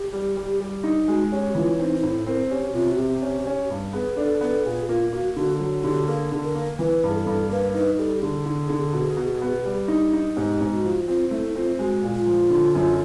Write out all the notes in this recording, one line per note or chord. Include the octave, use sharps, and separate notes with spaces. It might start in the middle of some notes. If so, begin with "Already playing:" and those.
Already playing: G4
G3
G3
G3
D#4
G#3 F#4
C#4 G4
E3 F4
C4 D#4
D#4
A2 E4
C4 A#4
C#4 G4
C3 F4
F#4
C3 G4
C#4
C#4
G2
B3 G#4
D4 A4
B3 A4
A#2 G#4
A#3 F4
A#3 F#4
D3 F#4
F#3
D3 G4
A#3 G#4
D3
A#4
A#3
E3 B4
G2
G#4
A4
G2
A#3 B4
D#4 B4
G3 A4
G4
D3 G#4
D3
D3
B2
B2
B3
G3
D#4
D#4
G#2 G4
G#2
F#4
F3
C4 F4
A3 E4
C4 F4
G#3 F#4
A#2
F4
F3
D3
F#2